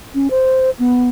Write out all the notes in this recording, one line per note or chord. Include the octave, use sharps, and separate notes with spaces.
C#4
C5
B3